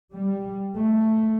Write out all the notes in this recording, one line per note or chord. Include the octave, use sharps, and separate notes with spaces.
G3
A3